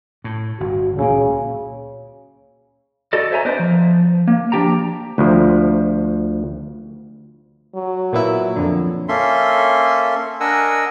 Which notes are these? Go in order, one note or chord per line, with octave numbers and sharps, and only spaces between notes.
A2
G1 F#4
C#2 A#2 C#3 A#3
F#4 A4 D5 D#5
C5 C#5 E5 G#5 A#5
B3 D4 B4 C5 D#5
F3
A#3
F3 D4 G4 G5 A#5
D2 F3
F#3
A#2 B3 E4
F2 A#2 D3
A#3 C#4 A4 E5 C6
D4 A#4 D#5 F#5 G#5 E6